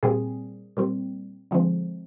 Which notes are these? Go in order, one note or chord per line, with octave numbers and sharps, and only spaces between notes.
A#2 G3 C4 G#4
A#2 G3 C4
D3 F3 G#3 C4